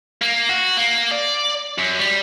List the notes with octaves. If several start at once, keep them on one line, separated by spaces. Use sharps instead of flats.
A#3
F#4
A#3
D5
F#2
G3